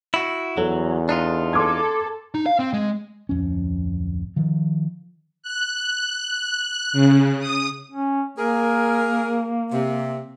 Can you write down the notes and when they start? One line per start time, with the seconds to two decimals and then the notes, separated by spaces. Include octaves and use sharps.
0.14 E4 F#4
0.57 E2 F#3 A4
1.09 D4 D#4 F4
1.53 A4 C6 D6 G#6
2.35 D#4
2.46 F5
2.59 C4
2.73 G#3
3.29 D1 F2 C#4
4.36 D#3 F3
5.43 F#6
6.93 C#3
7.40 D#6
7.92 C#4
8.38 A#3 G#4 A#4
9.71 C3